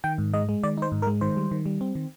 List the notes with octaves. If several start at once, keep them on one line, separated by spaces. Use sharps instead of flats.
D#3 G5
G#2
G#3 D#5
G#3
D#3 D5
D#4 C5
G#2
A#4
G#3
D#3 C5
G3
D#3
G3
C4
D#3